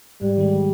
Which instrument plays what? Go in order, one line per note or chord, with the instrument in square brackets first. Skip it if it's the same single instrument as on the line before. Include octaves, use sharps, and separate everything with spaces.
[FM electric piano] G#2 [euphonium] G3
[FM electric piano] D#3 G#3